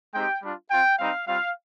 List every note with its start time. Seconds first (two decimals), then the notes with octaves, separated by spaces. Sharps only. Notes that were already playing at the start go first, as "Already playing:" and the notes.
0.14 G#3 C4 D#4 G4 G5
0.43 G3 D4 F4
0.71 C4 F4 G5
0.99 G3 C4 D#4 F5
1.27 G3 C4 F4 F5